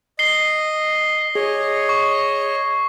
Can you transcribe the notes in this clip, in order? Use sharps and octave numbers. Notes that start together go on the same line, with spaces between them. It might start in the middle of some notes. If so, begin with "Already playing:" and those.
D#5 C7 G7
G#4 C#5 D#5
C#6